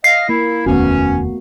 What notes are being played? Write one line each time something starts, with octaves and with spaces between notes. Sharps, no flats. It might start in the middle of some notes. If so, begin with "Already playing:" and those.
D#5 F5 C7
A#3 E4
F1 D#2 A3 B3 C#4 F#4